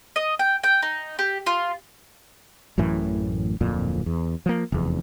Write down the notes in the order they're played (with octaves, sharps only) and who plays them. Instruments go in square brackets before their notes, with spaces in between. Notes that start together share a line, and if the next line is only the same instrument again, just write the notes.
[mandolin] D#5
G5
G5
D#4
G4
F4
[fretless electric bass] A1 F#2 A2 E3
D1 F2 A#2
E2
F3 A#3
F1 E2